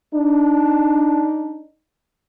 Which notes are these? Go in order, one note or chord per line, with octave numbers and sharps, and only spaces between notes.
D4 D#4